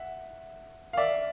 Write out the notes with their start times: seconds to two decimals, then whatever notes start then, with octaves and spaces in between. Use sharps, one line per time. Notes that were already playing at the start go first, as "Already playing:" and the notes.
Already playing: E5 F#5
0.93 F5
0.97 D5 E5